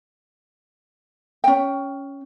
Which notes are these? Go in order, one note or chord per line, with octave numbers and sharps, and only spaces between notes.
C#4 G5